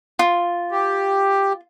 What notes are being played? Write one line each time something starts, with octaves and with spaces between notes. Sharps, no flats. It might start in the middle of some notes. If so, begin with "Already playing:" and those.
F4
G4